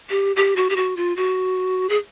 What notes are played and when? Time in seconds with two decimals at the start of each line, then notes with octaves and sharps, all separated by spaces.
0.10 G4
0.36 G4
0.56 F#4
0.70 G4
0.76 F#4
0.97 F4
1.17 F#4
1.89 G#4